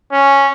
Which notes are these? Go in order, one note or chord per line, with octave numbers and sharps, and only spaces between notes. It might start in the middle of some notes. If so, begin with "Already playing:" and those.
C#4